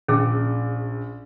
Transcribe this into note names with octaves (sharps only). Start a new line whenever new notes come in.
A#1 C#4 G#4